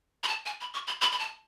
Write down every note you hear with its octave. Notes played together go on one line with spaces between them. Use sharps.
B5
A5
G#5
B5
C#6
B5
B5
B5
A5